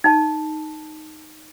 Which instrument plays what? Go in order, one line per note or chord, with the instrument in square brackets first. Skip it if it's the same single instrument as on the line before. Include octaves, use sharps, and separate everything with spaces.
[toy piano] D#4 A5